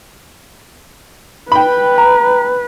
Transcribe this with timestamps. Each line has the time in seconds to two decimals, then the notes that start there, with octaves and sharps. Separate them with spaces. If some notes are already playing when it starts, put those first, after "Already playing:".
1.52 B4 G5 B5
1.98 A#5